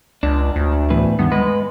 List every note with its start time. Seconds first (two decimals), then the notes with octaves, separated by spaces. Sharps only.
0.23 C#2 D4
0.56 D2
0.90 E2 A2 B4
1.19 G2 D#3 B3
1.32 G#3 B4